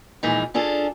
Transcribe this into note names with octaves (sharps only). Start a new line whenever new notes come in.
A#2 E3 F3 G#3 D#4
C#4 D4 F4 G#4 A4